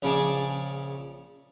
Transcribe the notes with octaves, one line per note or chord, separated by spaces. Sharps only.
A#1 C#3 C#4 G#4 A5 D6